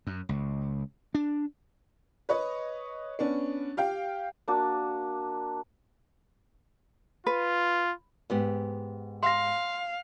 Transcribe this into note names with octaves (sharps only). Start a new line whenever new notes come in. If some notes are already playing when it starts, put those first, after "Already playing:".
F#2
C#2
D4
B4 C#5 D#5
B3 C#4 D4
G4 F5 G5
A#3 D4 F#4
F4 B4
G#2 B3 G4
F5 C6 A#6